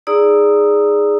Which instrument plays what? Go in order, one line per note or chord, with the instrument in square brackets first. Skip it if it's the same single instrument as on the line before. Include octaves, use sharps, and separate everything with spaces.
[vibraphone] D#4 G#4 D5 A#5 D#6 E6